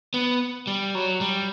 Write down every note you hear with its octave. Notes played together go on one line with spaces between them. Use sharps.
B3
G3
F#3
G3